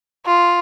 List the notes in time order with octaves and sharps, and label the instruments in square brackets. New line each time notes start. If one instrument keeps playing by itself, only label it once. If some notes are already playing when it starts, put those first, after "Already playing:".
[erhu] F4